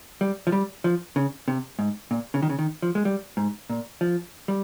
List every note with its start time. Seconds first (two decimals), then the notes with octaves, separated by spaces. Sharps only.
0.21 G3
0.47 F3
0.52 G3
0.84 F3
1.16 C#3
1.48 C3
1.79 G#2
2.11 A#2
2.34 C#3
2.43 D#3
2.50 C#3
2.59 D#3
2.82 F3
2.95 G#3
3.05 G3
3.37 G#2
3.70 A#2
4.01 F3
4.48 G3